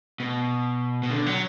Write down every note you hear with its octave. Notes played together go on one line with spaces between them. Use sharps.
B2
B2
D3
F#3